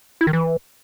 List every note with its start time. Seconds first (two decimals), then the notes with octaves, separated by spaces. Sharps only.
0.21 E4
0.27 D#3
0.33 E3